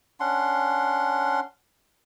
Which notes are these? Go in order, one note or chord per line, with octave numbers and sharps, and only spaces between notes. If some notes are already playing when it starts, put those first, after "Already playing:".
C#4 D4 F#5 C6